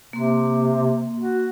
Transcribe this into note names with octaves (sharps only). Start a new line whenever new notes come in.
C3 A#3 C6
F#4